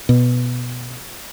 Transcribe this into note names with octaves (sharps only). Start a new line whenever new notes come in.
B2